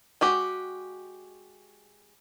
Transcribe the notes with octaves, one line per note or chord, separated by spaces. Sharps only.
G#3 F#4 G4